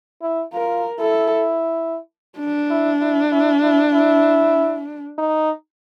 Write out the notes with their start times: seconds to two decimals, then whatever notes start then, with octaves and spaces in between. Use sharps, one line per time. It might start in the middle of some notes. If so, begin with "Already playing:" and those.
0.22 E4
0.53 F4 A#4
1.00 E4 A4
2.39 D4
2.70 E4
3.01 E4
3.32 E4
3.63 E4
3.93 E4
5.18 D#4